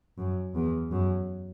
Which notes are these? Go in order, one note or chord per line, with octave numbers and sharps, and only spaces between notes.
F#2
E2
F#2